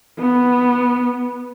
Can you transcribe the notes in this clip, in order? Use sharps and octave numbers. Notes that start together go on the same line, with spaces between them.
B3